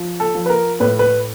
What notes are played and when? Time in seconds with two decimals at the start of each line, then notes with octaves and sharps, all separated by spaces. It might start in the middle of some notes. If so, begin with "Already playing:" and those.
Already playing: F3
0.20 A4
0.35 F3
0.46 B4
0.50 A#4
0.80 A2 B4
0.99 B4